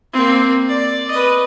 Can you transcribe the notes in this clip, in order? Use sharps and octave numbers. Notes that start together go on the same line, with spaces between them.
A#3 C4
D5
B4 D#5